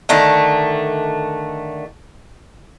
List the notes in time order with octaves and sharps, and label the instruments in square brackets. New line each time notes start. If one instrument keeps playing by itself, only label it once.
[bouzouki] D3 D#3 A3